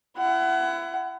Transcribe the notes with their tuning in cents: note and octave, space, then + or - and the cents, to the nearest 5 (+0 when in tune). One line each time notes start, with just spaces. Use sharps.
E4 +35 F#5 +25